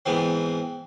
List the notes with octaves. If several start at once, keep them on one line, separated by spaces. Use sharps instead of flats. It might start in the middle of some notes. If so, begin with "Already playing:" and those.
G#2 E3 B3 C4